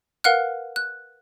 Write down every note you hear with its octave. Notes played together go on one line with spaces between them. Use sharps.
A#4 B4 F5 F#5 F6 F#6
F#6